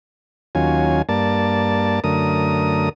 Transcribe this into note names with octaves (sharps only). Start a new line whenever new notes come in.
D#2 F#3 C#4 F4 G#5
G2 A#3 D5 A5
F#2 D3 A3 A#4 D#6